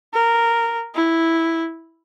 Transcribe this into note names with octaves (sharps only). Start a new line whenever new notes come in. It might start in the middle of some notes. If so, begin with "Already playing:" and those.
A#4
E4